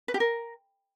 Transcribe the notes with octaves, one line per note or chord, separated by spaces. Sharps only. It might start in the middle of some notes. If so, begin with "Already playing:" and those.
B4
G4
A#4